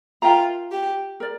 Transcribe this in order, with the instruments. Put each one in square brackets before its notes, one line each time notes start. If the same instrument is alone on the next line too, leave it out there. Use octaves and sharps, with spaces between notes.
[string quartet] F4 [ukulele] A#4 E5 G5 A#5
[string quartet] G4
[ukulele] A#4 D5